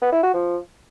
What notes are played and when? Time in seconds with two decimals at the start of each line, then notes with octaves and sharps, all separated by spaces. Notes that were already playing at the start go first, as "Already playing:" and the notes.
0.02 B3
0.12 E4
0.23 F#4
0.34 F3